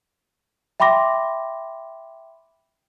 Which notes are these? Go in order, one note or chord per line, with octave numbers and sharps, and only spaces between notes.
E5 G5 B5 C6 D6 A#6